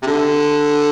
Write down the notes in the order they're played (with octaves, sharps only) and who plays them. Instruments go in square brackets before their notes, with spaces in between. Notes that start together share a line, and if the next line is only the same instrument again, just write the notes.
[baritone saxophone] C3
D3